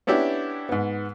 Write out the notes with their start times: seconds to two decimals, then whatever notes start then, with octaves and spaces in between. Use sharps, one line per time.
0.07 B3 C#4 D4 E4 G4
0.69 G#2 B3